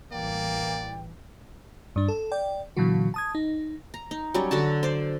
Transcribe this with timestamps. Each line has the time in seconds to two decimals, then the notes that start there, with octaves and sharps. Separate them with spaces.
0.12 A1 E3 G3 A#3 D5 G5
1.96 G2 D4
2.08 A4
2.32 D5 G5
2.77 A#2 D3 E3 F#3 F#4
3.14 A5 D#6 G#6
3.35 D#4
3.94 A#5
4.11 D#4
4.34 F#3 G3 C#4 C#5
4.51 D3 F#4 A5
4.83 C5 D5